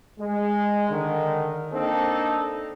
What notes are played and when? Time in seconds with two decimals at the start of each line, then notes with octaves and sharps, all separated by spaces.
0.20 G#3
0.90 D3 D#3
1.73 A#3 C4 D4 D#4 A4